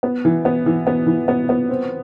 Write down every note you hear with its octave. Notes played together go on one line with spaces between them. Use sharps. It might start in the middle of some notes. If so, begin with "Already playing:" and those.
B3
E3
B3
E3
B3
E3
B3
B3
C4